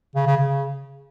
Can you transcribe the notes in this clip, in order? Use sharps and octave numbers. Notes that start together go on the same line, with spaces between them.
C#3
C#3
C#3